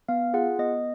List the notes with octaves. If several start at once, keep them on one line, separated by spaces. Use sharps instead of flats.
B3 F5
F4 G#4 F#5
B3 D#5